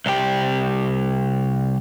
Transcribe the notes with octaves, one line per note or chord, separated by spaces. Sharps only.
C2 G4